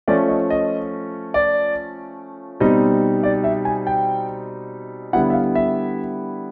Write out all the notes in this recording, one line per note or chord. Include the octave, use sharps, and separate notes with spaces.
F3 A3 C#4 F4 D5
D#5
D#5
D5
B2 G3 C4 D#4 D#5
D5
E5
G#5
G5
D3 G3 B3 E4 F#5
E5
F5
E5